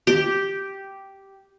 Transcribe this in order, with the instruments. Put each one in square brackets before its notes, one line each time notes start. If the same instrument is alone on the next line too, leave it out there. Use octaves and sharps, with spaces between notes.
[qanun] G4